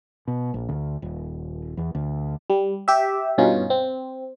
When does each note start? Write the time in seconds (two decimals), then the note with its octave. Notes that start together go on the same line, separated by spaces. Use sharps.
0.28 B2
0.54 A#1
0.69 D2
1.02 D#1
1.77 E2
1.95 D2
2.50 G3
2.88 G4 E5
3.38 G2 B2 C#4 D#4 F4
3.70 C4